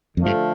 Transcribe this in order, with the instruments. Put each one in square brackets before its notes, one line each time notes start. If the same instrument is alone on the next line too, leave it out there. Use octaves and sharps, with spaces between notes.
[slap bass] F2 [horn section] D3 F3 A3
[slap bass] G2